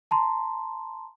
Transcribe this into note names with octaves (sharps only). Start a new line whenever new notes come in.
A5 A#5 C6